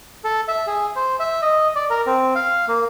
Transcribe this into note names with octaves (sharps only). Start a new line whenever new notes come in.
A4
E5
G#4
C5
E5
D#5
D5
A#4
C4
F5
A#3